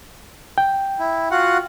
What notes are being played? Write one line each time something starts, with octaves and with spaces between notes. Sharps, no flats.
G5
E4
F4 F#4 F#5